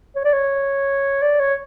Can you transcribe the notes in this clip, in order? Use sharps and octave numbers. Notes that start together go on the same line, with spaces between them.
C#5
D5
C#5
D5
C#5